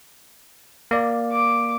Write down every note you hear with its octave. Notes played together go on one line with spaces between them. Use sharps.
A#3 D5
D6